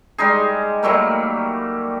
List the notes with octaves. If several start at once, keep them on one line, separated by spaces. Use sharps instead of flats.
G3 G#3 D#4 G#4
F#3 G3 A3 A#3